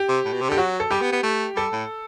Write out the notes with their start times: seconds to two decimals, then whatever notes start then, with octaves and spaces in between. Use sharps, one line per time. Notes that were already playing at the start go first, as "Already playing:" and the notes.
Already playing: G4
0.09 C3
0.25 A2
0.33 B2
0.41 C3
0.49 D3 G4
0.58 F#3 F#4
0.80 A4
0.91 G3 G4
1.01 B3
1.12 B3
1.23 A3
1.56 G3 A4
1.72 A2